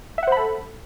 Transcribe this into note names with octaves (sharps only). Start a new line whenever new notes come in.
A4 C5 E5 F#5 B5